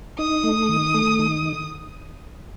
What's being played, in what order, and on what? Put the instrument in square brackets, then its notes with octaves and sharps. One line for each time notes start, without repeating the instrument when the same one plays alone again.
[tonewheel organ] D#4 [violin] D#6
[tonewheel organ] A3
D#3
A3
D#3